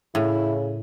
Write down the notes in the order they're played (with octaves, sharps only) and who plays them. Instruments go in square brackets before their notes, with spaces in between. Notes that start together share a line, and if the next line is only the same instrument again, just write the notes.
[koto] A2 [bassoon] C#3 [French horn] E4